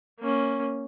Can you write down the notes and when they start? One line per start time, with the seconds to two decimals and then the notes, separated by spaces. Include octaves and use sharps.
0.20 A#3 C#4